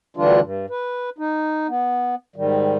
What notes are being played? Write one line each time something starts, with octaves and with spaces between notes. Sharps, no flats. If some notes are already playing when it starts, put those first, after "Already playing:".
D2 D3 E3 G3 D4 F4
G2
B4
D#4
B3
G#2 D#3 G3